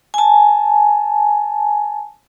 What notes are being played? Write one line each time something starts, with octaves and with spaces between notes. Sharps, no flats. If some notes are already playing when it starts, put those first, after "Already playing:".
G#5 A5